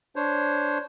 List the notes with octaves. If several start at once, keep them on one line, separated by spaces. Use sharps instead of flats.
D4 C5 C#5